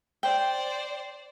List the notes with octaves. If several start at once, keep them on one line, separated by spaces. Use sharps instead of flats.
C5 D5 G5